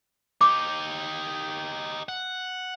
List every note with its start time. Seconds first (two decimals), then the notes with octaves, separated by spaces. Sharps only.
0.41 D#4 G4 D6
2.09 F#5